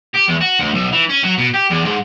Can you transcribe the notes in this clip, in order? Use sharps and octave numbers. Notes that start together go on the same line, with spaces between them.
G4
E2
F#4
D2
B1
E3
C#4
F#3
B2
G4
E2
G#2